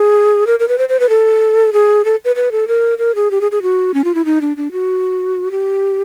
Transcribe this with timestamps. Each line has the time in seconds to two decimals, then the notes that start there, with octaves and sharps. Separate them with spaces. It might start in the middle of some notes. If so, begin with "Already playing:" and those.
Already playing: G#4
0.47 A#4
0.60 A#4
0.68 B4
0.78 C5
0.89 C5
1.00 B4
1.09 A4
1.73 G#4
2.05 A4
2.25 B4
2.36 B4
2.52 A4
2.68 A#4
2.98 A#4
3.15 G#4
3.31 G4
3.41 G#4
3.52 G#4
3.62 F#4
3.94 C#4
4.04 F4
4.15 E4
4.25 D#4
4.41 D4
4.57 D4
4.72 F#4
5.51 G4